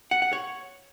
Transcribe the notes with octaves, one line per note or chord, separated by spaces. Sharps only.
F#5
F#5
C#5